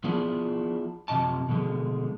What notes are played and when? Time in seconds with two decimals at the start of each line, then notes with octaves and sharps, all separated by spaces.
0.04 F3 B3 D4 E4 F4 G#4
1.08 F#2 C3 F3 D#5 A5
1.49 B2 D3 F3 G#3